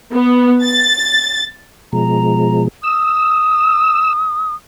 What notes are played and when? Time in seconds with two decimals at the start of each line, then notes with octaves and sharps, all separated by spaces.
0.13 B3
0.64 A6
1.93 B2 F3 G#3 A#5
2.83 D#6 E6